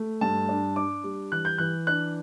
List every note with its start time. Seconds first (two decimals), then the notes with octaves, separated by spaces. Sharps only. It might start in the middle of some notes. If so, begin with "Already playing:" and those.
Already playing: A3
0.21 G2 A5
0.49 D4
0.76 D4 D6
1.04 G3
1.32 E3 F#6
1.45 G6
1.58 E3 F#6
1.87 D4 F#6